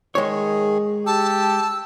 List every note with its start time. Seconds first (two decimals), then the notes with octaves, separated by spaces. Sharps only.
0.15 D#3 G#3 G#4 C#5
1.06 G4 A5 E6